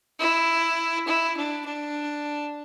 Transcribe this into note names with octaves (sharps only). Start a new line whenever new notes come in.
E4
E4
D4
D4